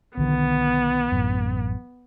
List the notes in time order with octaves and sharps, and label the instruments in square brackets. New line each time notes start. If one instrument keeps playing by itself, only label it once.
[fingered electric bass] B1 D3 D#3 [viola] B3
[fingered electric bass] A1 F#2